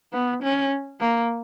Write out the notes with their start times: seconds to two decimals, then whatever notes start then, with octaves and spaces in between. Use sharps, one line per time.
0.13 B3
0.43 C#4
1.00 A#3